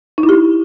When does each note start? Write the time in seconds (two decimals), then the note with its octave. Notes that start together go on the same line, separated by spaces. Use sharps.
0.18 D#4
0.23 E4
0.29 G4